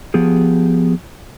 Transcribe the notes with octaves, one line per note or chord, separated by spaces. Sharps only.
F3 B3 G4 G#4